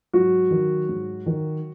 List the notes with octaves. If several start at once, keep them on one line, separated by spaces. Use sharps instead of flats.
G#2 F#3 F#4
D#3
G#2
D#3